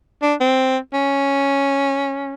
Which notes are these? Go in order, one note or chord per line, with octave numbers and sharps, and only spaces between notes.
D4
C4
C#4